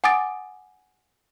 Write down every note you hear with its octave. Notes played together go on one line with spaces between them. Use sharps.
F#5 G#5 D6 D#6 A6 D7